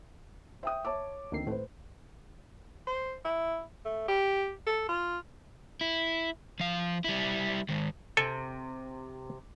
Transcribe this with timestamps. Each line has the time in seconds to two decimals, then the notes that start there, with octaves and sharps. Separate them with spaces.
0.63 C5 E5 G5 D#6
0.85 C#5 E5 A5 D6
1.32 D2 D#3 A#3 C4 C7
1.47 A2 A3 B4 C5
2.87 C5
3.25 E4
3.85 A3
4.08 G4
4.67 A4
4.89 F4
5.81 E4
6.60 F3 F5
7.04 G3 E4
7.69 D#3 G#3
8.17 C3 A4 G#5